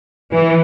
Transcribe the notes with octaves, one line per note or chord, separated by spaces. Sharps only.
E3